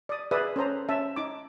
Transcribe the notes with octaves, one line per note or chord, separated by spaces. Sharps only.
D5 D#6
G#4 B4 D5 E5 D#6
C#4 A4 C5 A#5
C#4 E5 A5
D#4 D6